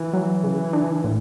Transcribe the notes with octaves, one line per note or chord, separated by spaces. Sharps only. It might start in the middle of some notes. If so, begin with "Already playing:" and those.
Already playing: E3
F#3
C#3
D4
A2